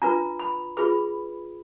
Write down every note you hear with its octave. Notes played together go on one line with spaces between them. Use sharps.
D4 F4 B4 A#5
B5
F4 G#4 B4 B5